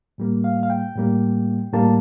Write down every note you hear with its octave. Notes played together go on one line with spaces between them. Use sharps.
A2 G3 A#3
F5
F5
G5
A2 G3 A#3
A2 G3 A#3 A5